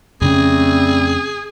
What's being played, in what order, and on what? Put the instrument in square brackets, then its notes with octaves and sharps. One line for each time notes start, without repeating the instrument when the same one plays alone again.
[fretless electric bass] F2 C#3 C#4 [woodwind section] G3 A3 C4 [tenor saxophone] G#4